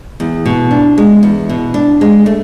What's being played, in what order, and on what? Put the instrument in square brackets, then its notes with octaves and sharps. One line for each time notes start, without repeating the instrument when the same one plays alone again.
[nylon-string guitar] E2
B2
D4
G#3
E2
B2
D4
G#3
A3